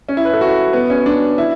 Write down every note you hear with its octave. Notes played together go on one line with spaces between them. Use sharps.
C#4
E4
B4
A4
F#4
B3
C#4
D4
E4